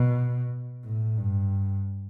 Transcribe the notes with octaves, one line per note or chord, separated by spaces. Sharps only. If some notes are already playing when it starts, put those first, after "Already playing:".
Already playing: B2
A2
G2